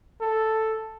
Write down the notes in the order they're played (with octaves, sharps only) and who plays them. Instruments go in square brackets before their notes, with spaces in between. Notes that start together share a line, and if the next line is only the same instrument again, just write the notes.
[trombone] A4